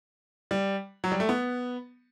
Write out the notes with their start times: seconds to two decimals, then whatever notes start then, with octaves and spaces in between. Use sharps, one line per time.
0.51 G3
1.04 F#3
1.12 G3
1.20 A3
1.29 B3